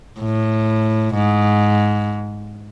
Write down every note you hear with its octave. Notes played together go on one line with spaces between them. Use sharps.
A2
G#2